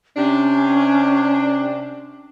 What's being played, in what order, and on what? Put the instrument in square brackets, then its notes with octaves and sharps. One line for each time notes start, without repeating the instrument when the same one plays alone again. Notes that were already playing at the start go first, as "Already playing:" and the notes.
[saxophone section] C3 D4 [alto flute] C#4